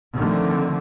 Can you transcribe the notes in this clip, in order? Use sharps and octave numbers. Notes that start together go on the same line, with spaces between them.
D3 D#3 F3 A3 C4